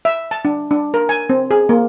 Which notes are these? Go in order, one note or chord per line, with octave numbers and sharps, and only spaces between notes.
E5
A5
D4
D4
A#4
G#5
C4
G#4
A#3